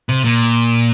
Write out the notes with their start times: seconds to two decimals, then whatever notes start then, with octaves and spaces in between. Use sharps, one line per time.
0.09 C3
0.24 A#2